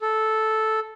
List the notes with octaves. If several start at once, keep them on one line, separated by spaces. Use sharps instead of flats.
A4